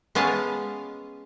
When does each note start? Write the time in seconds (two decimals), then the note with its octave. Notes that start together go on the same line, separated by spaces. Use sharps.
0.15 G#3 B3 C#4 F5 G#5 A5